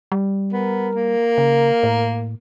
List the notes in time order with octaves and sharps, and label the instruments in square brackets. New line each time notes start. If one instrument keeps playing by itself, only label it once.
[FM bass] G3
[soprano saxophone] B3 [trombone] A#4
[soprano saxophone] A#3
[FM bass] C#3
A2